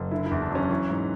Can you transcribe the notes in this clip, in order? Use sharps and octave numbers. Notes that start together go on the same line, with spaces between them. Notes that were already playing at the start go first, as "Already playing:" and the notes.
Already playing: F#1
D3 E4
E4
E2
D4
F#3 C#4
E3
G#2